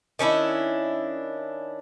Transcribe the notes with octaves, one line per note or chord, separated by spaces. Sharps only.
D#3 C#4 D4 E4